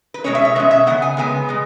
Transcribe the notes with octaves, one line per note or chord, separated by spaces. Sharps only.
B4
B2 G#3 C#4 C#5
E5
C#5
B2 G#3 C#4 E5
E5
C#3 G#3 B3 F#5
G#5
C#3 G#3 B3 G#5
B2 G#3